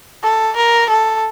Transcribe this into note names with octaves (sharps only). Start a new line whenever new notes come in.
A4
A#4
A4